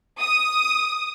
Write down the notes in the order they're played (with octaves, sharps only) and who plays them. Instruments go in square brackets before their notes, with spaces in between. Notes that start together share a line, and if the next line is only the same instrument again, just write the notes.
[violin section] D#6